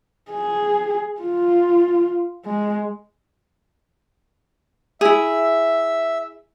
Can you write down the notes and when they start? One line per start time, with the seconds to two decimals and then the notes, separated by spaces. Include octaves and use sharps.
0.32 G#4
1.21 F4
2.46 G#3
5.01 E4 G#4 E5